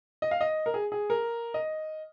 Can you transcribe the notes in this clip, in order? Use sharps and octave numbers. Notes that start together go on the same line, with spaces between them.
D#5
F5
D#5
A#4
G#4
G#4
A#4
D#5